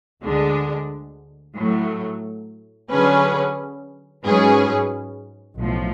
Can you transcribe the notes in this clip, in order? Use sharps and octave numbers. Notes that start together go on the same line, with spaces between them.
D2 D3 G#3 D4
A2 F#3 A3
D3 F#3 C#4 G#4 B4
G#2 F#3 C#4 G#4 B4
B1 A2 F3